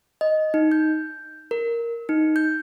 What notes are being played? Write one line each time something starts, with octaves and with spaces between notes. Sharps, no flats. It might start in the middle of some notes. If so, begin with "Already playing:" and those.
D#5
D#4
G6
A#4
D#4
G6